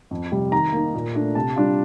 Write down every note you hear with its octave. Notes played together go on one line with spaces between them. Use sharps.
F2
C3 G3
D#3 A#5
A#3 D#4
A#2
A3 D4
C3 A5
G3 D4 F4